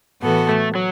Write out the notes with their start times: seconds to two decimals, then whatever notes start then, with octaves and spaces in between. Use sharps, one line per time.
0.22 A2 E3 B3 F#4 A4
0.49 A3
0.75 F#3